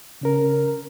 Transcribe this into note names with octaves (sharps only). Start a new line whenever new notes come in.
C#3 C#4 A#4